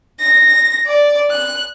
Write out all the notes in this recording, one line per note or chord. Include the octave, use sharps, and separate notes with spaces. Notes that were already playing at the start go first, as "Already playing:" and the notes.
A#6
D5
F#6